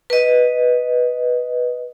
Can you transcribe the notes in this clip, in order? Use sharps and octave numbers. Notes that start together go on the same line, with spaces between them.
B4 D#5